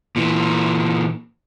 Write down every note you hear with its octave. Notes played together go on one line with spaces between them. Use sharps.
A#2 E3